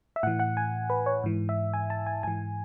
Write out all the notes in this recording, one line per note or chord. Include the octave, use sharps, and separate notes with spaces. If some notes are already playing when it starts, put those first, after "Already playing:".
E5
A2 E3 F#5
F#5
G#5
B4
C#5
G#2 E3
E5
G#5
A5
G#5
G#2 E3 G#5